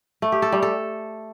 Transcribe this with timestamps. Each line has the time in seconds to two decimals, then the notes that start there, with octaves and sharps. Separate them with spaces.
0.22 A3
0.32 G4
0.42 A4
0.52 G3
0.62 A4